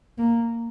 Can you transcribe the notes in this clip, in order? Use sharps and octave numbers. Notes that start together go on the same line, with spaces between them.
A#3